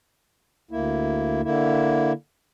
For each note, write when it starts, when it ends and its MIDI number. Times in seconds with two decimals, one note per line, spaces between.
0.71 1.41 38
0.71 1.41 58
0.71 1.41 64
1.43 2.12 50
1.43 2.12 58
1.43 2.12 64